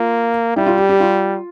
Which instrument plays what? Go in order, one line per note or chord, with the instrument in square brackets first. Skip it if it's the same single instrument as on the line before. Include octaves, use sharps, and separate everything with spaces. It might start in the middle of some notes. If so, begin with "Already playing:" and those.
Already playing: [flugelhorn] A#3 [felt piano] F4
[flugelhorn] G3 [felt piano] E4
[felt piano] F4
G4
G4
F4